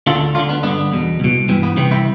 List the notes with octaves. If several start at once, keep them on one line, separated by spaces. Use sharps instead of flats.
D2 D3 F4 A4
D2 D3 D4 F4
B3 D4
G2 D3 B3 D4
E2 B2
C2 B2
G2 E3 C4
B3
C2 C3 E3 C4
C4 E4